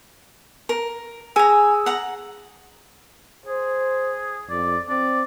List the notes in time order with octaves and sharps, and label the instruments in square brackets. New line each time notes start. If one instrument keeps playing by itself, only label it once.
[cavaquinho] A#4
[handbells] G#4 E6 [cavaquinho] G#5 A#5
[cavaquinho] F#5 A#5
[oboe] G#4 [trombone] C5
[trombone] F2 [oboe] D5
[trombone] C4 [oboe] D5